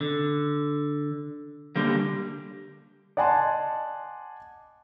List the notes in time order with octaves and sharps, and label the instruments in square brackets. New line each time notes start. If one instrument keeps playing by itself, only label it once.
[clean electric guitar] D3
D3 G3 A#3
[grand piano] D5 D#5 F#5 G#5 A5 C6